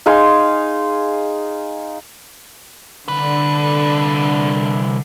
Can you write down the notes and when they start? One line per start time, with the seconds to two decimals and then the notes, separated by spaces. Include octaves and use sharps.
0.06 D#4 G#4 F5 C6
3.08 C2 D3 B4